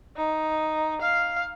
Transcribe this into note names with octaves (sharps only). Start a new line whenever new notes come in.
D#4
F5